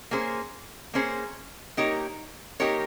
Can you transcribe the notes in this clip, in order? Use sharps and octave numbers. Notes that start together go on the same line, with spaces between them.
A#3 C#4 G#4 C5
A#3 C#4 G#4 C5
A#3 D#4 G4 A#4 C#5
A#3 D#4 G4 A#4 C#5